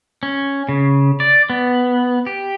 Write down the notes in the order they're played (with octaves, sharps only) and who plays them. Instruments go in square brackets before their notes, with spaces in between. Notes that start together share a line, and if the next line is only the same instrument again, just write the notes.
[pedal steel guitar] C#4
C#3
D5
B3
G4